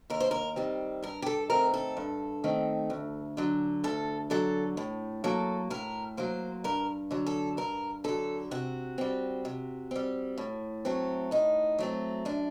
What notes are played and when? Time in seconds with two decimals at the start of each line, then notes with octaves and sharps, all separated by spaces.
0.10 D#2 A#4
0.20 C5
0.31 A#4
0.56 D#3 G3 C4
1.03 G2 A#4
1.22 G4
1.26 A4
1.50 D#3 A3 C4 A#4
1.74 A4
1.97 G2
2.44 D#3 A3 C4
2.90 D2
3.37 D3 F#3
3.84 D2 A4
4.30 D3 F#3 A4
4.77 A2
5.24 F#3 A#3 A4
5.70 A2 A#4
6.17 F#3 A#3 C5
6.64 G2 A#4
7.11 D3 F#3
7.27 A4
7.57 G2 A#4
8.04 D3 F#3 A4
8.51 C3 F#4
8.98 G3 C4
9.45 C3
9.91 G3 C4
10.38 A2
10.85 F#3 A3 C4
11.31 A2 D#4
11.79 F#3 A3 C4
12.25 F#2 D4